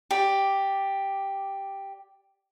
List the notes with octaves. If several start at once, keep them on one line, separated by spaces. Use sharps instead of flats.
G4 D5